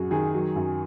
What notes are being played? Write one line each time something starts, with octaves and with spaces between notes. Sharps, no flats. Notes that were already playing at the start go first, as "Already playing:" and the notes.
Already playing: F#2 F#3 F#4 G#4
D#3 G#4
F#3
F#2